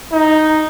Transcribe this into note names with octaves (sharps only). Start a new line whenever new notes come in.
D#4